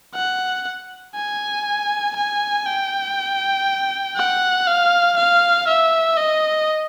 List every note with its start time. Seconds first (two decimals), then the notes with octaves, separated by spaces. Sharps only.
0.15 F#5
1.15 G#5
2.16 G#5
2.66 G5
4.17 F#5
4.67 F5
5.17 F5
5.67 E5
6.17 D#5